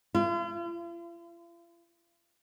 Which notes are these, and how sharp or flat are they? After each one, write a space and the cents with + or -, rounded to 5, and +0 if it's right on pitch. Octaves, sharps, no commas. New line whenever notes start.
F4 -45